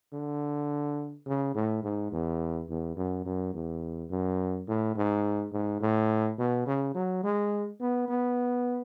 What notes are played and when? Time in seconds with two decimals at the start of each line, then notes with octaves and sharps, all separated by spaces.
0.13 D3
1.26 C#3
1.55 A2
1.84 G#2
2.12 E2
2.69 E2
2.97 F#2
3.25 F#2
3.54 E2
4.10 F#2
4.68 A2
4.96 G#2
5.52 G#2
5.81 A2
6.38 B2
6.67 C#3
6.95 F#3
7.24 G#3
7.80 B3
8.09 B3